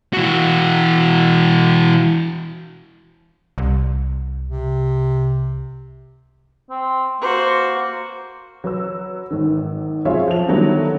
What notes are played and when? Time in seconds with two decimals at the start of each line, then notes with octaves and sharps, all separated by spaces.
0.13 E3 F#4
3.58 C2
4.48 C3
6.70 C4
7.21 A#3 F#4 C5
8.64 F#3 B4 E6
9.31 G#1 D#3
10.05 F#3 C4 F4 G#4 C#5 E5
10.28 F3 F7
10.48 D3 D#3 F#3 G3 A3 B3